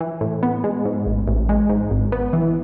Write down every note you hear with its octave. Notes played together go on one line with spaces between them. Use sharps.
E3
A2
B3
G#3
G#2
A1
A1
G#3
G#2
G#1
B3
E3